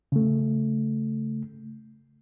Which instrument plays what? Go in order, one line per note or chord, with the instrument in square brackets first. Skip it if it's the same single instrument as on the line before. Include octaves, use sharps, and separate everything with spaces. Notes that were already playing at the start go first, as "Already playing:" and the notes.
[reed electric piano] C#3 A3